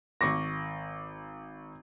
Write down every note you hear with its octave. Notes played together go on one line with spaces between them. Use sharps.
G#1 C#6 D6 A#6